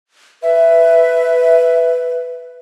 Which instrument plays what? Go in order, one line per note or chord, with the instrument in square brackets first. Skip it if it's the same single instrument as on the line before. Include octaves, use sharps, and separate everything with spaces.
[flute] B4 [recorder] E5